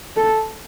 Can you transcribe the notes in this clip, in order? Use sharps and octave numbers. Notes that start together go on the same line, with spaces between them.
A4